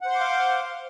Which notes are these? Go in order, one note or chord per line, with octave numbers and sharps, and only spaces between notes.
C5 F5 F#5 C6 D6